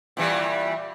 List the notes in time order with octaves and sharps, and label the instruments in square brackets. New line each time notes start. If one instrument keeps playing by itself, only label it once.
[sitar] A#2 E3 G3